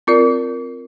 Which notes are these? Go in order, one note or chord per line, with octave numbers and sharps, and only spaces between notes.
C4 F4 A#4 D5